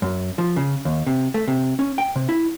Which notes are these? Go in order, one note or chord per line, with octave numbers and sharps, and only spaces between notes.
F#2
F3
C#3
D#2
C3
A3
C3
C#4
G5
C3
E4